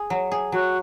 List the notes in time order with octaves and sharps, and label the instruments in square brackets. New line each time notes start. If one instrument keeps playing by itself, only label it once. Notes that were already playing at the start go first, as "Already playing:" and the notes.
Already playing: [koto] G#4
F#3
G#4
[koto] F#3 [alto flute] F#4